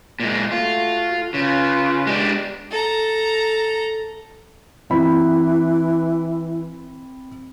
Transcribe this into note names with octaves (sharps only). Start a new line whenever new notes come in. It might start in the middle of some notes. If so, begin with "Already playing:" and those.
A#2 G#3
A3 F4 F#4
C#3 F4 B4
G#3 D4 G4
A4 A#5
E3 C4 B5